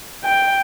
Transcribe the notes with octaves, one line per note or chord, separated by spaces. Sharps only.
G5